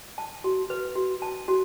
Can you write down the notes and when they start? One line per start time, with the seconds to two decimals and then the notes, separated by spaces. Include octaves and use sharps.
0.18 A5
0.44 F#4
0.70 B4
0.95 F#4
1.22 A5
1.48 F#4